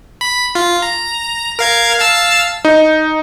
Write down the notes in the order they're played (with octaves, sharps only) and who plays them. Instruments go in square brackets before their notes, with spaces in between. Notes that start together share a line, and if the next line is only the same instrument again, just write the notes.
[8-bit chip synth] B5
F4
A#5
A#4 F5 G#6
F5 A5 E6
[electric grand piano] D#4